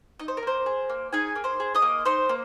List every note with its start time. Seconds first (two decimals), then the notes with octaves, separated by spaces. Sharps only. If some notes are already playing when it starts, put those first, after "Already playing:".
0.19 D#4 D#5
0.28 C5
0.37 A#4
0.43 A#3 C5
0.66 G#4
0.89 A#3
1.13 D#4 G#4 G#5
1.36 A#3
1.44 C5 C6
1.60 G#4
1.75 D#5 D#6
1.82 A#3
2.06 D#4 C5 C6
2.29 A#3